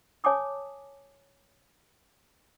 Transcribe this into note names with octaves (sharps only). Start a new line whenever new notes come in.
C#5 G#5 A5 D6 D#6